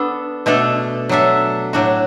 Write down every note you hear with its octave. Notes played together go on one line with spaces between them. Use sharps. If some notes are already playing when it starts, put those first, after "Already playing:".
Already playing: B3 D4 A4
B2 A3 D4 A4
F#3 D4 A4 E5
A2 F#3 D4 F#4